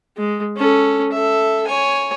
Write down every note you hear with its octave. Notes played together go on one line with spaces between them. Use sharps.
G#3
C#4 A4
A4 E5
C#5 G#5